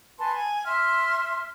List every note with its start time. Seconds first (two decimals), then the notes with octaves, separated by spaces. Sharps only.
0.18 B4 G#5 A5 C6
0.33 G#5
0.66 E5 C6 F6